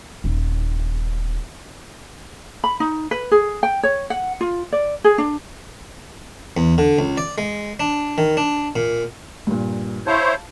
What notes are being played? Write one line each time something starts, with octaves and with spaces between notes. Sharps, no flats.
D#1 D#4
B5
D#4
B4
G#4
G5
C#5
F#5
F4
D5
G#4
D4
E2
D3
C#2
D5
G#3
D4
D#3
D4
A#2
G2 A#2
E4 C5 C#5 F5 A5